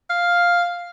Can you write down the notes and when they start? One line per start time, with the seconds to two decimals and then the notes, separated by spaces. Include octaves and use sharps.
0.10 F5